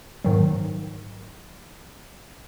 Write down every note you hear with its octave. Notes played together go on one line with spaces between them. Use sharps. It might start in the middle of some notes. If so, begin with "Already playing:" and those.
G#2 D#3 F#3